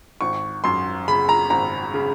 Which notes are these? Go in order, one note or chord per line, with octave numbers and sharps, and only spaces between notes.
G#1 C#6
F#2 C6
C#3 B5
A#5
G#1 A#5
C#3